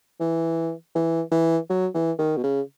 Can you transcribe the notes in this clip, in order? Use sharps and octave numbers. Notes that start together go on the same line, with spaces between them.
E3
E3
E3
F#3
E3
D#3
B2
C#3